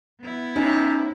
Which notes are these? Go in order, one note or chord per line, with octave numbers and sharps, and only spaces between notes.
B3 E4
C3 C#4 D#4